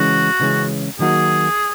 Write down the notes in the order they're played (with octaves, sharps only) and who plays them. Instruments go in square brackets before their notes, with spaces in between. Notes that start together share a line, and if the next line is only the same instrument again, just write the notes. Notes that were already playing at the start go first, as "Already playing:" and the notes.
Already playing: [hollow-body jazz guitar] C#3 E3 G#3 C#4 [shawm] F#4
[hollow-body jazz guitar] C#3 E3 G#3 C#4
[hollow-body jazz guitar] D#3 F#3 A#3 D#4 F#4 [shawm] G#4